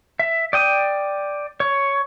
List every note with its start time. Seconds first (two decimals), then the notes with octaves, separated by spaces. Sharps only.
0.19 E5
0.53 D5 G5 D#6
1.60 C#5